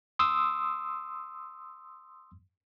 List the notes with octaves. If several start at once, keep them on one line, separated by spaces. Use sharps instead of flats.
C6 D#6 E6